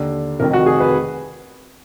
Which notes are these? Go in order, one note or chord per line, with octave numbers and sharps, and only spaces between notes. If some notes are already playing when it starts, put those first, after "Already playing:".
Already playing: D#2 D3
F1 F2 D#3 A#4
F#4
G#4
B4